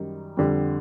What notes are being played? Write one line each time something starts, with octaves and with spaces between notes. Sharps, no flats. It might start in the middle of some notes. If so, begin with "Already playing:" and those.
Already playing: F#2 D#3 G3
F2 D3 G3